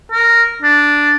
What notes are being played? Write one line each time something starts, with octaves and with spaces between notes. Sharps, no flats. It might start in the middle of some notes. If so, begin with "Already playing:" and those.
A#4
D4